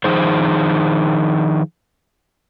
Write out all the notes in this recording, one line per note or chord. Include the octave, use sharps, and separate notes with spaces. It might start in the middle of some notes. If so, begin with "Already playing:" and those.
D#3 F3 D#4 G#4 C5